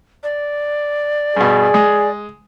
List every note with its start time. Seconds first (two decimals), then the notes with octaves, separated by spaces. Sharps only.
0.23 D5
1.37 G2 B2 G#4
1.74 G#3